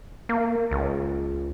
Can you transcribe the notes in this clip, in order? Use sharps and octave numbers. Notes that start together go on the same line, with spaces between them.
A#3
C#2